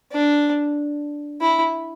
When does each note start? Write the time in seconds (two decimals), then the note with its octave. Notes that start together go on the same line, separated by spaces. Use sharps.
0.12 D4
1.41 E4